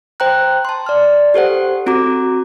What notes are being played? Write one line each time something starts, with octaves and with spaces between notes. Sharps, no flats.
C5 G5 A#5 F#6
A5 C6
D5 F6
G4 A4 C5 F#5
C4 F#4 A#5 D6